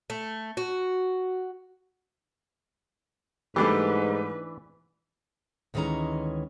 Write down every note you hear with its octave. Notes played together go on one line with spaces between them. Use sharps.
A3
F#4
G#2 E3 G3 A3 D4 G4 B4
D2 D#3 E3 G#3 C#4 A#5